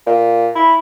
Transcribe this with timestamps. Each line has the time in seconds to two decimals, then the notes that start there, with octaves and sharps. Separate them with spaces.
0.06 A#2
0.55 E4